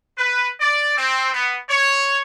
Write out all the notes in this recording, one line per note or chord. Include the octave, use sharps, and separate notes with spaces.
B4
D5
C4
B3
C#5